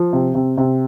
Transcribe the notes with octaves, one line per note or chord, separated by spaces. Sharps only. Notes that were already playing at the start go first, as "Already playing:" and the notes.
Already playing: F3
C3
C3
C3